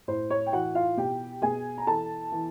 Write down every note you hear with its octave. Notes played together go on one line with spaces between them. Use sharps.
A2 C5
C#5
G5
E3 F#4 F#5
F4 F5
B2 G4 G5
B2 G#4 G#5
A#5
E3 A4 A5
E3